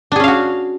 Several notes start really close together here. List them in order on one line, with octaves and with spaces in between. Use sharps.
D4 G#4 C#4 F5 F#4